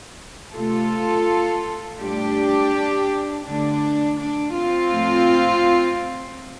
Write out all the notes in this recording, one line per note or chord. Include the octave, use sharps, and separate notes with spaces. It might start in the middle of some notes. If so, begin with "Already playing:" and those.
C3 A3 F4 A4
A2 G3 D4 G4
D3 A3 D4
D4
C4 F4
A2 F3 A3